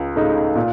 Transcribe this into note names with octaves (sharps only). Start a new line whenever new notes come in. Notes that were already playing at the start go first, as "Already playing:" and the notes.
Already playing: C#2
C#3 A3 D#4
A#2